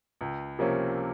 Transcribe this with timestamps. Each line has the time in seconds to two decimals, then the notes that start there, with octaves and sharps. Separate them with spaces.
0.21 C#2
0.59 C3 F3 A#3 C#4